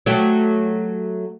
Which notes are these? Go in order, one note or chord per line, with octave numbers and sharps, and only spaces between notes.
F#3 A3 G4